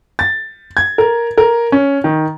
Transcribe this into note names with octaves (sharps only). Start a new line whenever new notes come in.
A6
G#6
A#4
A#4
C#4
D#3